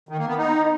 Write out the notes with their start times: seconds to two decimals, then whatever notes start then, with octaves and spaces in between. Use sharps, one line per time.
0.09 D#3
0.18 A#3
0.28 B3
0.38 D#4